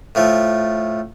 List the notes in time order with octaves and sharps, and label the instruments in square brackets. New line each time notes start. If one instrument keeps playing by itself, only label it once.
[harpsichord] A2 F3 A3